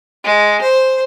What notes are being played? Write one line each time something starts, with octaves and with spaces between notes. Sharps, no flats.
G#3
C5